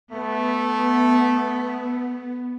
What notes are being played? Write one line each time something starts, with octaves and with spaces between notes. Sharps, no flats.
A3 B3